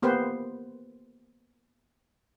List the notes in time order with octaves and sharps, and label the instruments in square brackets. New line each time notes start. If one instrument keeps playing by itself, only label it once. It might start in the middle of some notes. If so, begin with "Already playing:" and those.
[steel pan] A#3 B3 G4 B4 C5